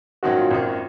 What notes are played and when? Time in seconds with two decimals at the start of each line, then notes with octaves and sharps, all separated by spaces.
0.23 A#1 G#2 D#3 F#3 C#4 F#4
0.37 F4
0.51 G#1 F#2 D#3